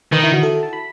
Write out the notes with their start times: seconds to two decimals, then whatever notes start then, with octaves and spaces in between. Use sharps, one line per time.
0.13 D#3 B4
0.23 E4
0.33 F#4
0.43 A4
0.63 A5
0.73 B5